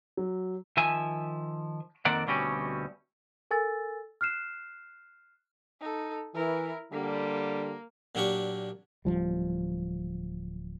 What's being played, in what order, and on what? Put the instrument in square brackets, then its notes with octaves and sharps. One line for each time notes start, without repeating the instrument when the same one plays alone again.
[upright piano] F#3
[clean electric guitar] D#3 F3 E5 G#5
F2 D#3 A#3 C4 D5 F#5
D2 B2 G3 C4 C#4
[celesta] A4 A#4 G#5 E6 A6
F6 F#6 C7 E7
[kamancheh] D#4 A4
[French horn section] E3 [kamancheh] E4 A#4
[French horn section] D3 G3 [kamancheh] A#3
[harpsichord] A#2 F#3 A#3 D4 G4 C#6
[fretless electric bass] D1 A#1 F3 G3